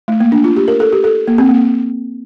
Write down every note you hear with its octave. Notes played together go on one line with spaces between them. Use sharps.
A3
A#3
D4
F4
G4
A#4
A4
G4
A4
A#3
C4
A#3